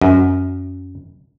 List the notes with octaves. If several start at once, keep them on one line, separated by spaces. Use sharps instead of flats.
F#2